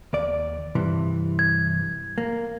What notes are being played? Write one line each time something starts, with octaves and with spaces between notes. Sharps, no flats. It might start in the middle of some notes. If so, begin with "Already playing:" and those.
D#2 D5
G2 C3 E3
G#6
A#3